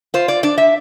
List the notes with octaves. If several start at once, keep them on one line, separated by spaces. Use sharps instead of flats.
F4 C5
D5
D4 D5
E5